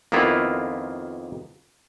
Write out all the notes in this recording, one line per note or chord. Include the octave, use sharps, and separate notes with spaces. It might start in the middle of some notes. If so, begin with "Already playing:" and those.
F2 D#3 A#3 B3 E4 F4